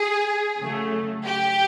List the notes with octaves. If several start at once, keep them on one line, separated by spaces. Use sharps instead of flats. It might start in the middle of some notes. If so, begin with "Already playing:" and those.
Already playing: G#4
C#3 F#3 A3
G4